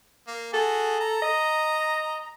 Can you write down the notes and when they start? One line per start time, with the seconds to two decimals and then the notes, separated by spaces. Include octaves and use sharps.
0.28 A#3
0.53 F#4 G#4 A4
1.00 A#5
1.22 D#5